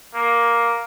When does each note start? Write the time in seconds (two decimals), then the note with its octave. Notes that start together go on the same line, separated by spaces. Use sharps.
0.14 A#3